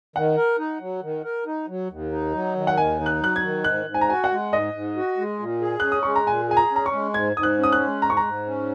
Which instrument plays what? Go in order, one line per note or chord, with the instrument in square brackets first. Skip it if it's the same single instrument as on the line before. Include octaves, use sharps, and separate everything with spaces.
[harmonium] D#3 [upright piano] F#5
[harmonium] A#4
D#4
F#3
D#3
A#4
D#4
F#3
D#2
D#4
F#3
D#3
[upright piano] F#5
[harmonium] D#2 [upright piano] G#5
[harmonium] D#4
[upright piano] F#6
[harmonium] F#3 [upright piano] F#6
[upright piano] G#6
[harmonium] D#3
[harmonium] G#2 [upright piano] F#6
[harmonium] G#2
[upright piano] G#5
A#5
[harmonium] F#4 [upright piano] G#5
[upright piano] F#5
[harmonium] G#3
[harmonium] G#2 [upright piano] D#5
[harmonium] G#2
F#4
G#3
A#2
G#4
[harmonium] C#4 [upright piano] F#6
[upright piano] D#6
[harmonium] G#3 [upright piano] C#6
[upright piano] A#5
[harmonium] A#2 [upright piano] G#5
[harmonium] G#4 [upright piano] G#5
[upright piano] A#5
[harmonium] C#4
[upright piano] A#5
C#6
[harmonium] G#3
[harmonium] G#2 [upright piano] G#6
[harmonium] G#2 [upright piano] D#6
[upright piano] F#6
[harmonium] C#4
[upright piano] D#6
F#6
[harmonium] G#3
[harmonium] G#2 [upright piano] A#5
[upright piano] C#6
A#5
[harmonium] G#2
C#4